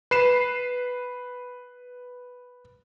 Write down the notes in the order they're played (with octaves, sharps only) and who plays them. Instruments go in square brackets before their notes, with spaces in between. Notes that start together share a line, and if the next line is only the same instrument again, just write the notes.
[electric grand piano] B4 C7 E7